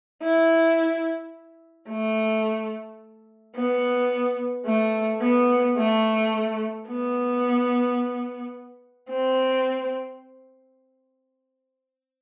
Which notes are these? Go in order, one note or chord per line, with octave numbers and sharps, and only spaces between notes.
E4
A3
B3
A3
B3
A3
B3
C4